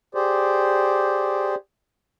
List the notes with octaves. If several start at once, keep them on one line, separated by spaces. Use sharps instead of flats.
G4 G#4 C5 D5